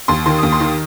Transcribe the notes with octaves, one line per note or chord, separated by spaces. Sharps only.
D#2 C6
D#3 C6
D#2 D#6
C6
D#3